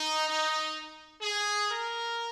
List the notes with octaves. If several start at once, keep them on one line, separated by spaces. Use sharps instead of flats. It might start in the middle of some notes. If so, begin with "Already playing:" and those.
Already playing: D#4
D#4
G#4
A#4